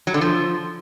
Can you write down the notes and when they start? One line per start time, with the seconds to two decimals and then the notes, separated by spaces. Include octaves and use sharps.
0.07 F#3
0.14 D3
0.21 F3